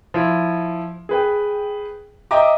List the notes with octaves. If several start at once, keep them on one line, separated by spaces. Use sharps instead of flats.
F3 E4
G#4 B4 G5
D#5 E5 G5 A#5 D6